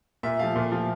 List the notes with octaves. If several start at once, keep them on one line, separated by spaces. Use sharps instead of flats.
A#2 E5
F3 A3 F5
A#2
F3 A3